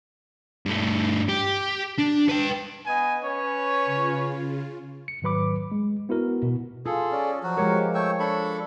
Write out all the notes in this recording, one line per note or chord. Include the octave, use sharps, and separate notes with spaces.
G2 A3
G4
D4
B4 G5
B3 D#5 G#5
C#4 B4 C#5
C#3 F4
C#7
G#2 D#3 F#3 B4 B5 D6
G#3
B3 E4 F#4 A#4
B2
F4 G#4 A4
C#4 D5
F3 F#3 F#4
F3 G#3 G4 A#4 C#5
A3 C#5 G5 C#6 E6
D4 A4 B5 C#6